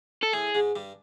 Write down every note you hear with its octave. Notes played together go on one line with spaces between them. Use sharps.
A4
A2 A3 G#4
G#2 G#3
G2 G3